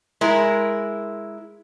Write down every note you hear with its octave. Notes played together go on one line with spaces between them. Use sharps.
G#3 E4 A#4